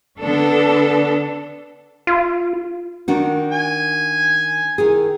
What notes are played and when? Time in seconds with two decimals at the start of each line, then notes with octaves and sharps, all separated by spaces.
0.20 D3 B3 D4 A4
2.07 F4
3.08 D#3 D4 F#4
3.51 G#5
4.78 D#3 E4 G#4